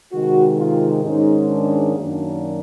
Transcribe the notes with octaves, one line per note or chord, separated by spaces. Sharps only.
C3 D#3 G#3 F#4
F4
G#2 D#3 G#3 C#4 D#4
D4
F#2 D#3 F#3 A#3 D4